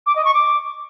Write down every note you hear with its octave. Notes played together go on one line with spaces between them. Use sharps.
D6
D#5
C#6
D6